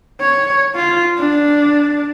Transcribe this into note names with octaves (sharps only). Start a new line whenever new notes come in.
C#5
F4
D4